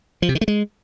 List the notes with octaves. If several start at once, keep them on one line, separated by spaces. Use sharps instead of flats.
F3
C3
D#3
A3
G#3